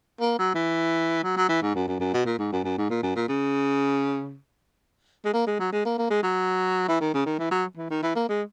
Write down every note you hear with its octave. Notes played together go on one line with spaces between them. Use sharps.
A#3
F#3
E3
F#3
F#3
E3
G#2
F#2
F#2
F#2
B2
A#2
G#2
F#2
F#2
G#2
A#2
F#2
A#2
C#3
G#3
A#3
G#3
F#3
G#3
A#3
A#3
G#3
F#3
E3
D#3
C#3
D#3
E3
F#3
E3
D#3
E3
A#3
G#3